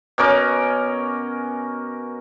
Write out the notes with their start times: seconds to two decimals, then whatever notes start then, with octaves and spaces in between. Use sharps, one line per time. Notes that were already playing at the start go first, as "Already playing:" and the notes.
0.18 B2 C#4 A#4 D6